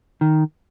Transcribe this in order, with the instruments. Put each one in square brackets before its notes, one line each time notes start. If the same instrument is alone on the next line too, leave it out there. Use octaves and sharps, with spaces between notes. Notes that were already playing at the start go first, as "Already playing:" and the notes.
[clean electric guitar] D#3